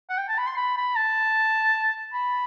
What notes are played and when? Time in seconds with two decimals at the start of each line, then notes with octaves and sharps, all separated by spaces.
0.10 F#5
0.18 G5
0.28 A5
0.38 B5
0.47 C6
0.57 B5
0.77 B5
0.95 A5
2.13 B5